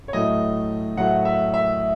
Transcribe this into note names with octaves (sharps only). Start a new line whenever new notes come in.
C#5
A2 F#3 A3 D#5
A2 F#3 A3 F#5
E5
E5